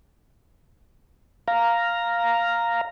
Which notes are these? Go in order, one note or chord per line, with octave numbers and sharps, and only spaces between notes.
F5 A#5